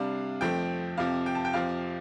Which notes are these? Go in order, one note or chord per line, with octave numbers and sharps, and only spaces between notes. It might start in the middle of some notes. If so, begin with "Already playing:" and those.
Already playing: C3 G3 D4 F5
F2 F3 A3 C4 G5
F2 C3 F3 C4 F5
G5
A5
G5
F2 C3 F3 C4 F5